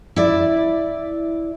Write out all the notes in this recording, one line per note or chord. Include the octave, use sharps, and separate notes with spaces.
E4 D5